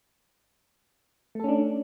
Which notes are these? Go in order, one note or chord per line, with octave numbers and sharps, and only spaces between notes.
A3 C#4 D4 A4